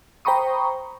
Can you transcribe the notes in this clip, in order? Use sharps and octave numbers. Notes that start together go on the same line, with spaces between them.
C5 G5 A#5 B5 C#6 D#6